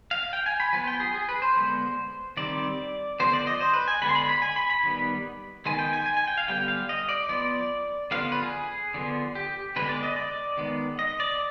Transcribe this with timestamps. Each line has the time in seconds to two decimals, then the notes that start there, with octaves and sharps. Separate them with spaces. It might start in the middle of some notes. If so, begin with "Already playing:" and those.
0.11 F5
0.33 G5
0.46 G#5
0.60 B5
0.73 F3 B3 G#5
0.87 G5
1.00 G#4
1.14 G#4
1.29 B4
1.42 C5
1.55 D3 G#3 B3
2.37 D#3 G3 C4 D5
3.20 D3 F3 B3 C5
3.33 D5
3.47 D#5
3.60 C5
3.74 B4
3.88 G#5
4.01 D3 G#3 B3 B5
4.09 C6
4.15 B5
4.29 B5
4.42 G#5
4.56 B5
4.70 B5
4.83 D#3 G3 B3
5.66 D#3 G#3 B3 G#5
5.79 G5
5.93 G#5
6.06 G#5
6.17 G#5
6.27 G5
6.38 F5
6.48 D3 G3 B3 G5
6.68 F5
6.89 D#5
7.09 D5
7.29 F3 B3 D5
8.11 D3 F3 B3 F5
8.32 B4
8.42 G#4
8.94 D3 F3 B3
9.35 G4
9.76 D3 G#3 B3 B4
9.89 D5
10.03 D#5
10.16 D5
10.57 D#3 G#3 B3
10.99 D#5
11.20 D5